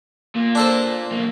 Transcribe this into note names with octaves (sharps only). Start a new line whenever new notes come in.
A#2 A#3
D4 A4 C5
B1 A#3